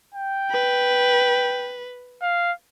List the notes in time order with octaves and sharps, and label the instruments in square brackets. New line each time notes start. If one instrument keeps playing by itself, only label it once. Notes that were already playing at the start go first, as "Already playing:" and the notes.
[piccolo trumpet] G5
[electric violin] B4
[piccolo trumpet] F5